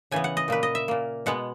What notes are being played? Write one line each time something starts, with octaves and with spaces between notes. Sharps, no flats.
C#3 E3 B3 G#5
F#5
D#5
A#2 A#3 B4
D#5
E5
A#2 A#3
B2 G#3 B3 F#5